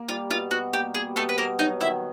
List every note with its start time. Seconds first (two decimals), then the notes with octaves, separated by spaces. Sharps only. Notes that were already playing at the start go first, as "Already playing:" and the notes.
Already playing: A#3
0.09 G3 F4
0.30 B2 F4
0.51 B2 F#4
0.73 A#3 G4
0.95 G3 G#4
1.16 B2 A3 A4
1.29 B4
1.37 B2 A#3 A#4
1.59 F#3 D#4 D#5
1.81 D#3 E4 E5